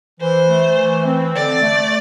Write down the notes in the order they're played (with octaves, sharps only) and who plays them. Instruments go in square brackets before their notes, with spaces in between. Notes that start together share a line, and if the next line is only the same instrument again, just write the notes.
[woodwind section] E3 [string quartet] C5
[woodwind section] A3
E3
C4
[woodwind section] D3 [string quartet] D5
[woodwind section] A3